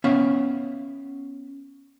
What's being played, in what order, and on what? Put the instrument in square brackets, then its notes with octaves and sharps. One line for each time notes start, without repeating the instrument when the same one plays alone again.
[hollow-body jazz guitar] B3 C#4 E5 F5